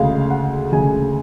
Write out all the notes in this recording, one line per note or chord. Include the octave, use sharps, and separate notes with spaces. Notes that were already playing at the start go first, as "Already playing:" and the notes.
Already playing: D2 C#3 G#3 F5
F#5
D2 C#3 G#3 G#5